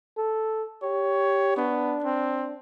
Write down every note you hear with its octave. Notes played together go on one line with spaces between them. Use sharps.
A4
G4 C#5
B3 D4
C4